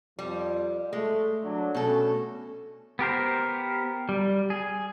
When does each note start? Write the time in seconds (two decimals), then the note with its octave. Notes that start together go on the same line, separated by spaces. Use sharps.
0.19 F2 F3 G3
0.93 G#3 A3
1.43 F#3 D4
1.75 B2 A3 C#4 A4
2.99 B3 G4 A#4 C5
4.09 G3
4.50 G#4